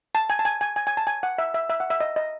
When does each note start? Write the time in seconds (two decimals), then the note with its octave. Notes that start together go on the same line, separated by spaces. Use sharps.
0.15 A5
0.30 G#5
0.39 A5
0.45 G#5
0.61 G#5
0.76 G#5
0.87 G#5
0.97 A5
1.07 G#5
1.23 F#5
1.38 E5
1.54 E5
1.70 E5
1.80 F#5
1.90 E5
2.00 D#5
2.16 D#5